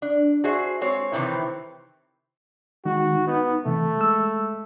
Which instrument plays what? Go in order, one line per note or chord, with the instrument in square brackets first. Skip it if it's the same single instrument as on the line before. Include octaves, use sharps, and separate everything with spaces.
[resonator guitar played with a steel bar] D4
F#4 G#4 C5 E5
G#3 C4 C#5
C3 D#3 E3 C4 E4
[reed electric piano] D#3 G#3 D#4 [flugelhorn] F#4
[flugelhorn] B3 [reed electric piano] D#4
[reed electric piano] C3 E3 [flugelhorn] A3
[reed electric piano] G#3 E6